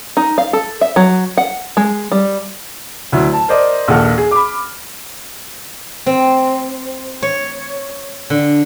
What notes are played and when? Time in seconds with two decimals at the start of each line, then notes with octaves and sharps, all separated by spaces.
0.17 D#4
0.38 F5
0.53 A4
0.81 E5
0.96 F#3
1.38 F#5
1.77 G#3
2.12 G3
3.12 D2 F#3 E4
3.33 A5
3.48 A#4 C5 D5 D#5
3.88 A#1 D#2 A4 F#5 F6
4.18 G#4
4.31 B5 D6
6.06 C4
7.23 C#5
8.30 D3